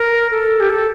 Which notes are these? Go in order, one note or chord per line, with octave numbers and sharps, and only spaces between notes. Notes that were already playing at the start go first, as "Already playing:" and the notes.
Already playing: A#4
A4
G4
A4